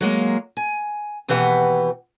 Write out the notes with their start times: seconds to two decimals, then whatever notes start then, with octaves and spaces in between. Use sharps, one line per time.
0.01 F#3 G#3 A#3
0.57 G#5
1.28 D#2 B2 E3 G4 B4 F#5